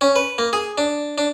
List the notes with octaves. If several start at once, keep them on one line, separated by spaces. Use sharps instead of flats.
C#4
B4
A#3
G#4
D4
D4